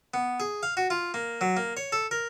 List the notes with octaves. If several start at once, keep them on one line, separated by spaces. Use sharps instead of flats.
B3
G#4
F5
F#4
F4
A#3
F#3
A#3
C#5
A4
A#4